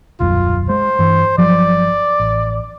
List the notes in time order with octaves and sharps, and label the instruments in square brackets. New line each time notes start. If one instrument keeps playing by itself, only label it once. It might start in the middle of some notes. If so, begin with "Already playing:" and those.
[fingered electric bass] D#1 B1 F#2 [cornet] F4
[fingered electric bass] G#3 [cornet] C5
[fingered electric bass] G2 E3
[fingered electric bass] G1 F3 F#3 [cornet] D5
[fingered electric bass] A1